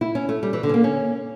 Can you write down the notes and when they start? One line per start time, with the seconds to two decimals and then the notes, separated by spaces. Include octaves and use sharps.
0.01 E4
0.15 C#4
0.29 A3
0.43 G3
0.53 E3
0.63 D3
0.69 C#4
0.74 A#3
0.84 C#4